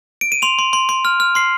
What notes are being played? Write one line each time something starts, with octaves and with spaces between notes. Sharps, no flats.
D7
D#7
C6 F7
C6
C6
C6
F6
F6
C6 C7